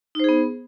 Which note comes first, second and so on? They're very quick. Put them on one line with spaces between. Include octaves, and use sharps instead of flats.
D#4 C5 G#4 B3